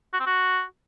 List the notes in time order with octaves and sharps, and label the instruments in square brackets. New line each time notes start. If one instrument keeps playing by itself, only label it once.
[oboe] F#4
C4
F#4